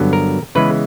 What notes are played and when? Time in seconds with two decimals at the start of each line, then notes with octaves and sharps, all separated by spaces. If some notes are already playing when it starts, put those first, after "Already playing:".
Already playing: G2 D3 F#3 B3
0.13 A#4
0.55 C#3 E3 G#3 B3 B4